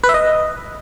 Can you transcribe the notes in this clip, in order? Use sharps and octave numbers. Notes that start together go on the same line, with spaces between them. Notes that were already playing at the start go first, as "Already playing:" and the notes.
B4
E5
D#5